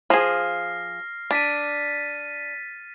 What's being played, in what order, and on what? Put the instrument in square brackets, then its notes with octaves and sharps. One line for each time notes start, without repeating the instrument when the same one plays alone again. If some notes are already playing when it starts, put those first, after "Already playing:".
[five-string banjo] F3 G#4 [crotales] F6 A#6 C7
[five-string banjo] D4 [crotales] A6 B6 D#7